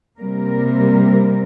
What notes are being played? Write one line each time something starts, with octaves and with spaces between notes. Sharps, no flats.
C3 G3 A#3 A#4